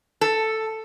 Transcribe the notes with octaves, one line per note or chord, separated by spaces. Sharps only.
A4